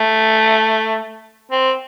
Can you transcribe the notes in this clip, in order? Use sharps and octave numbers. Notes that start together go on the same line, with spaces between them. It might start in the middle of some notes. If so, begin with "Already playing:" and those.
Already playing: A3
C4